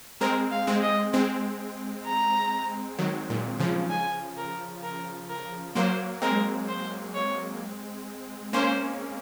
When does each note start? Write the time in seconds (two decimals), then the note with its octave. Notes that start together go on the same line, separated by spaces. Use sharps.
0.21 G#3 C4 A#4
0.52 F5
0.67 G#3 C4
0.83 D#5
1.13 G#3 C4
2.06 A#5
2.99 D#3 F#3
3.30 A#2
3.60 C#3 F3
3.90 G#5
4.37 A#4
4.83 A#4
5.30 A#4
5.75 F#3 A#3 C5
6.22 G#3 C4 A#4
6.68 C5
7.15 C#5
8.53 A#3 C#4 C5